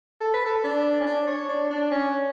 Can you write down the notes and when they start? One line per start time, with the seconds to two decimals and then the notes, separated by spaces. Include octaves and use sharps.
0.21 A4
0.34 B4
0.46 A4
0.64 D4
1.01 C#4
1.06 D4
1.27 C#5
1.49 D4
1.70 D4
1.91 C#4